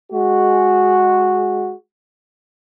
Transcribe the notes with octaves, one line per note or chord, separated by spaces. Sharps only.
G#3 F#4